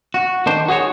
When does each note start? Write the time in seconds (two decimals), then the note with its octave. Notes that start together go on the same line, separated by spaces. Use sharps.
0.14 F#4
0.46 D#3 D4 C5
0.68 F#4 G#4 C5 C#5